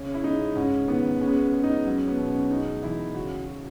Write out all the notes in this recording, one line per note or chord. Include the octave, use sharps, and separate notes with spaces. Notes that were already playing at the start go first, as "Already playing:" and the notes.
Already playing: C#3 C#4
E4
G#3 D#4
G#2 C#4
D#3 B3
G#3 C#4
B3
C#4
G#3
D#4
F#3 C#4
B3
B2
C#4
G#3 D#4
E3 E4
C#3 F#4
F#4